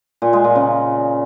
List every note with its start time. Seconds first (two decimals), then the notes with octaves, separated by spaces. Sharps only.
0.22 A#2
0.33 G#3
0.44 A#2
0.55 C#3